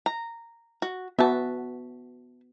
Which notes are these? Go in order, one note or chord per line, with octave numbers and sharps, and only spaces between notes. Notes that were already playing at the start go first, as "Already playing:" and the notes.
A#5
F#4
B3 F#4 E5 A5